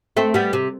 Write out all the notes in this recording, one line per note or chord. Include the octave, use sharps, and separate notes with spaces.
A3 C4
G3 B3
C3